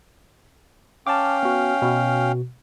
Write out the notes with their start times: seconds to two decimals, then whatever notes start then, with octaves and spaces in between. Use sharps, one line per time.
1.07 C#4 F5 G5 A5 D6
1.43 B3 F#4
1.82 B2 F#4